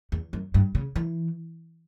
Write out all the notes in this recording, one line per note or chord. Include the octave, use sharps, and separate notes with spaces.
E2
F#2
G2
C#3
E3